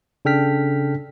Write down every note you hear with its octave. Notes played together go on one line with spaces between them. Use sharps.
C#3 D4 A4 G5 F6 B6